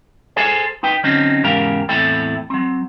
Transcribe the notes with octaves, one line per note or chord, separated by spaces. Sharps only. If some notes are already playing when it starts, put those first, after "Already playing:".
G#4 A4 C5 G#5
D#4 B4 G5
D3 F#3 C4 C#4 D#4
E2 G#2 C#3 G4 A#4 F5
E2 A2 C4 E4 A4 G5
F#3 C4